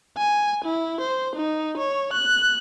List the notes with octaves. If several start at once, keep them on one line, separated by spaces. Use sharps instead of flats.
G#5
E4
C5
D#4
C#5
F#6